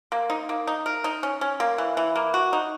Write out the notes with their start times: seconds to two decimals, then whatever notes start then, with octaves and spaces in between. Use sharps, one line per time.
0.12 A#3
0.30 D#4
0.49 A#3
0.67 D#4
0.86 A#4
1.04 D#4
1.23 C#4
1.41 C#4
1.60 A#3
1.78 E3
1.97 E3
2.16 A#3
2.34 F#4
2.53 D#4